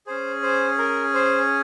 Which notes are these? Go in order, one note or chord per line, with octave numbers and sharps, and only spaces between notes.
C#4 G#4 C5
C5
A#4
C5